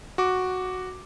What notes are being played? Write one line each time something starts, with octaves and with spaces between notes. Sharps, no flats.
F#4 D6